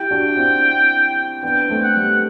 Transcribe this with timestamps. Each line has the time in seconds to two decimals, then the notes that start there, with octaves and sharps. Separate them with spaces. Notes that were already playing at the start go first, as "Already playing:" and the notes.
Already playing: E4 G4 G5
0.11 D4 F#4
0.37 C4 E4
1.43 B3 D4 G5
1.69 A3 C4
1.82 F#5
1.96 G3 B3